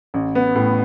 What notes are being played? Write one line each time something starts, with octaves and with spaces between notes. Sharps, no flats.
A1
B3
A2